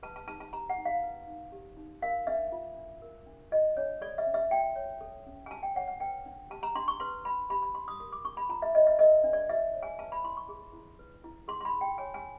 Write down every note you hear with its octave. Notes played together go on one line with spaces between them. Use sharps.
B4 A5
A5
D#4 A5
A5
G4 A#5
F#5
D#4
F5
B4
D#4
G4
D#4
A#4 F5
D4 E5
F4
D4
A#4
D4
F4 D#5
D4 C#5
A4 D5
E5
C#4
E5
F#4 G5
C#5
A4
C#4
G#5
F#4 A5
G5
C#5 F#5
F#5
B4 G5
D4
G4 A5
A#5
D4 C6
C#6
B4 C6
D4 B5
G4 B5
B5
D4 C6
D#6
A#4 D#6
D6
D4 C#6
B5
F4 A#5
E5
C#5 D#5
E5
A#4 D#5
D4
D5
F4 E5
C#5
G#5
B4 A5
B5
E4 C6
C#6
G#4
E4
B4
E4
G#4 C6
C6
B5
E4
G5
C#5 G#5
G#5